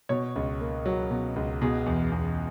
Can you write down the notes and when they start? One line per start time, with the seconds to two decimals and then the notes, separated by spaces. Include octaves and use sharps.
0.09 B2 C#5
0.36 C#2
0.61 A#3
0.86 F#3
1.11 B2
1.36 C#2
1.61 B2 G#4
1.86 E2
2.12 E2